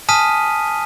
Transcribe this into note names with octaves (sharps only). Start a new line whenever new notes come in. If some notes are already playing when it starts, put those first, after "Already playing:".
G#5 A5 D#6 F6 B6 D#7